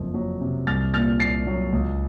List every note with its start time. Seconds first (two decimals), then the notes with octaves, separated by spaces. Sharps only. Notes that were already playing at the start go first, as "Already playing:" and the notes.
Already playing: F#1 F2 A#3
0.14 F#3
0.41 C3
0.67 C2 F6 A6
0.94 A#2 F6 A6
1.20 C2 A6 C7
1.47 F#3
1.72 C#2